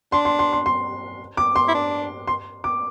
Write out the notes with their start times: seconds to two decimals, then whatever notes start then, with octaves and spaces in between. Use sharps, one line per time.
0.12 D4 C6
0.25 C6
0.39 C6
0.53 C6
0.66 C6
1.37 D6
1.56 C6
1.68 E4
1.74 D4
2.27 C6
2.64 D6